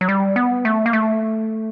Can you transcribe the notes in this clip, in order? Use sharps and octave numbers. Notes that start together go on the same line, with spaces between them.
F#3
G3
B3
A3
A#3
A3